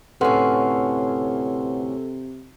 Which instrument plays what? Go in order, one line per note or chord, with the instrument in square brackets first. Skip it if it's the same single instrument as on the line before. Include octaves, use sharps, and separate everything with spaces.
[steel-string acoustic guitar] D2 A2 C#4 [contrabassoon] C3 [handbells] A4 [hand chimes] B4 F#5 C6